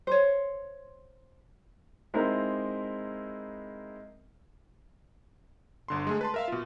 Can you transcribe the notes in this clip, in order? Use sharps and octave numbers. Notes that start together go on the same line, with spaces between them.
C5 C#5
G#3 C4 D#4 E4 A#4
G1 D3 C6
G#3 A3 G#4
B4 A5 C6
A#4 E5 F5
B2 F4